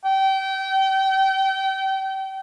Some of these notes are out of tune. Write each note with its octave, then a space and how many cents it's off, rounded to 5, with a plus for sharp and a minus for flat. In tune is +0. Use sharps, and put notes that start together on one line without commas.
G5 -30